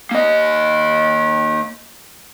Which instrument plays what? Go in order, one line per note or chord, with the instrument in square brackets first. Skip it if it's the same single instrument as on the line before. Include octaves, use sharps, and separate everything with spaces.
[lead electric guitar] A#3 D#5